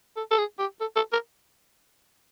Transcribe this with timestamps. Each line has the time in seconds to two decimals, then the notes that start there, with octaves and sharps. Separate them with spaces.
0.16 A4
0.31 A4
0.38 G#4
0.59 G4
0.80 A4
0.96 A4
1.12 A#4